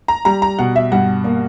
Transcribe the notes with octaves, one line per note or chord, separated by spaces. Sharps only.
A#5
G3 A#5
A#5
B2 F#5
E5
G2 F#5
A#3